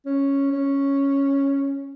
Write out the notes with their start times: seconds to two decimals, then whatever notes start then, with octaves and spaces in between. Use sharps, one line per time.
0.05 C#4
0.52 C#4